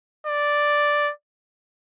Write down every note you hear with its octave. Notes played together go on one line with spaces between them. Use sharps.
D5